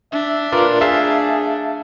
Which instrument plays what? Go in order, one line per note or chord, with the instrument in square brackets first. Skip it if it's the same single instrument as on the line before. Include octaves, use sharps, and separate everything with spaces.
[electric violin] D4 [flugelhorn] E5
[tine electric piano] F4 A#4 D5 [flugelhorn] B4
[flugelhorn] G#4 [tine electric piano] E5 F5 A5